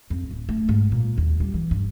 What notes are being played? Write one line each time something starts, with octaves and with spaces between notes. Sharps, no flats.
F2
D1
A3
G#2
A#2
D#2
G3
E3
G2